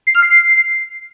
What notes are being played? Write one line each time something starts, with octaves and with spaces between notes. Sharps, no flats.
C7
F6
C7